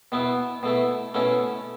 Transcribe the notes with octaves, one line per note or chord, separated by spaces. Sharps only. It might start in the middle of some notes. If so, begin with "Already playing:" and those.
B2 B3 E4
B2 A3 E4
B2 A3 C#4 E4